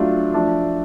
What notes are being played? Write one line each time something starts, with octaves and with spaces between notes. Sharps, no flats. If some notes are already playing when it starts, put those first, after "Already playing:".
Already playing: F#3 A3 D4 F4
F3 A3 D4